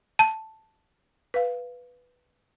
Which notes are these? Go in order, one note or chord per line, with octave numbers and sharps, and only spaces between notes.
A5
B4 F5